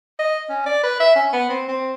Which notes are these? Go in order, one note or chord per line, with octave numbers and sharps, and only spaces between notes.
D#5
C#4
D5
B4
E5
C#4
B3
C4
C4